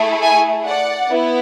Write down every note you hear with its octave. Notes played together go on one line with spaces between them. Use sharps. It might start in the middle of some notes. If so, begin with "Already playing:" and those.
Already playing: A3 E4 G#4
E5 G#5
D5 F#5
B3 E4